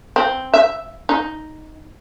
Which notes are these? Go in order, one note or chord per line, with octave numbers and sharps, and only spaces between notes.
C4
E5
D#4